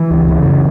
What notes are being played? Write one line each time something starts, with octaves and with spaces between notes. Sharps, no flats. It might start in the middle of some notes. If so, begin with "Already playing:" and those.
Already playing: E3
C#2
C#3
F#2